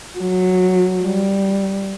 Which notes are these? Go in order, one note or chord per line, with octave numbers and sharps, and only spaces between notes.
F#3
G3